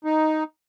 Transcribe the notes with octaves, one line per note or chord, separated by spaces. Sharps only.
D#4